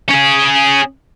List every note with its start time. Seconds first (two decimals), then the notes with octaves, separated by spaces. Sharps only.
0.11 C#4 G#4